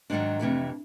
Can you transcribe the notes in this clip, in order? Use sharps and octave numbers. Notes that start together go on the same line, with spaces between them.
G#2 D#3 F#3 D4
F2 C3 E3 A3